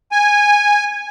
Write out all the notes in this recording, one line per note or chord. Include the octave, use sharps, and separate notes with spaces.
G#5